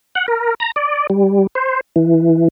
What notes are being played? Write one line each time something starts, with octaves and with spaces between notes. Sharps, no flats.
F#5
A#4
A#5
D5
G3
C5
E3